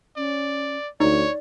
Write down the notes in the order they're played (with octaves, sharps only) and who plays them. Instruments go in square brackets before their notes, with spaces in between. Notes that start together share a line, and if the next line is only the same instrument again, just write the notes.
[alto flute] C#4 [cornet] D5
[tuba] D2 [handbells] D#4 [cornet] C#5 [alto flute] D5